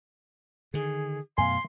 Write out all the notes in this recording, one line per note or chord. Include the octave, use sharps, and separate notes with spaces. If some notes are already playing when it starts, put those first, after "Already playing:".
D3 D#3 G#4
F#2 B2 A3 F5 G#5 C6